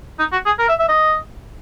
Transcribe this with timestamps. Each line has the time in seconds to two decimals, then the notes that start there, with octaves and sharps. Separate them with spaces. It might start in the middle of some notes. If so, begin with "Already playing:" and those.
0.19 D#4
0.32 F#4
0.46 G#4
0.59 A#4
0.69 E5
0.79 E5
0.88 D#5